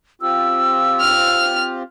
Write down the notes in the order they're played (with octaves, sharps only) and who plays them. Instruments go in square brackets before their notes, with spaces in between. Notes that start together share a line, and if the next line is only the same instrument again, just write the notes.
[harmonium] C4 F4 G4 [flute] E6
[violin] F6